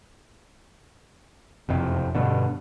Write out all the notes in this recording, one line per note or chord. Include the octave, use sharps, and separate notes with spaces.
F#1 F2 C3
G2 B2 D3